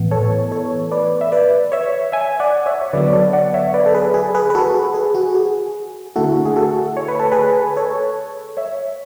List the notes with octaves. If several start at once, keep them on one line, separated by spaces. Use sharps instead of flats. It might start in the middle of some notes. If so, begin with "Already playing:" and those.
Already playing: A2 E3 B3
A4 C#5
A4 C#5
B4 D5
E5
B4 D5
C#5 E5
E5 G#5
D5 F#5
C#5 E5
C#5
D3 F#3 B3 B4 D5
D5
A4 C#5
D5 F#5
C#5 E5
B4 D5
A4
G#4 B4
G#4
G#4 B4
B4
F#4 A4
G#4
G#4
F#4
G#4
D3 A3 E4 F#4 A4
G#4
F#4 A4
C#5
B4
A4
G#4 B4
A4 C#5
C#5 E5